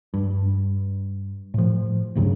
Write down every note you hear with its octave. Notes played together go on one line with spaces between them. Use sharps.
G2
A2 F3
D2 G2 C#3 F#3